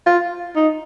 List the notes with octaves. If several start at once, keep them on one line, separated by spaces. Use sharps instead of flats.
F4
D#4